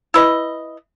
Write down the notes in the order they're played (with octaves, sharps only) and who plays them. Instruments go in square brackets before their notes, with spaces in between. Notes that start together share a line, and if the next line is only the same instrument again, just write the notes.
[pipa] E4 B4 D#5